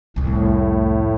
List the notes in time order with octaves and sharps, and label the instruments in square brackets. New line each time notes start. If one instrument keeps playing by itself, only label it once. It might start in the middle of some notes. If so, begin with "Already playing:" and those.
[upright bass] C2 F2 [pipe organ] A2